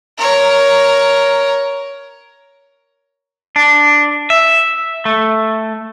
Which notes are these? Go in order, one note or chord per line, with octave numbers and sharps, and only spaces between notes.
A#4 C#5
D4
E5
A3